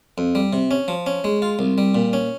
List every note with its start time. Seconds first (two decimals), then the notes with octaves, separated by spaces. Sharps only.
0.18 F2
0.35 G3
0.53 C3
0.71 C#4
0.88 F3
1.06 C#4
1.24 G#3
1.42 F4
1.59 C2
1.78 G3
1.95 A#2
2.13 C#4